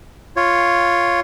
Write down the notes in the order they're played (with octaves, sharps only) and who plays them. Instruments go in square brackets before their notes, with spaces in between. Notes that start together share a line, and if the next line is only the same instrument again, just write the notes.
[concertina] F4 C#5